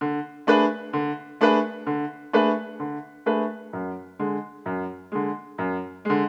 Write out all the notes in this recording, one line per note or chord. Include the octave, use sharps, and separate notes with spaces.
D3
A3 D4 G#4 B4
D3
A3 D4 G#4 B4
D3
A3 D4 G#4 B4
D3
A3 D4 G#4 B4
F#2
D3 G#3
F#2
D3 G#3
F#2
D3 G#3